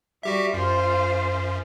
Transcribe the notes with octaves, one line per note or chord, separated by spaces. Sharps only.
G3 F#4 G4 E5
F#2 F4 C5